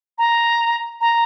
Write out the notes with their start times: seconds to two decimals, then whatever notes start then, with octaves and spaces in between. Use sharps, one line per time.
0.18 A#5
1.00 A#5